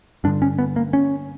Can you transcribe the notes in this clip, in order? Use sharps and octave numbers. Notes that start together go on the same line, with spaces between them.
G2 D3 D4
C#4
B3
A#3
C#4